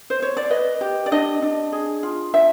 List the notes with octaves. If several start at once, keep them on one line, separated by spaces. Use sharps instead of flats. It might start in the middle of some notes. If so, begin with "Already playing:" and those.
C5
C#5
D5
B4 D#5
G4
D5
D4 D#5
D4
G#4
F4
D4 E5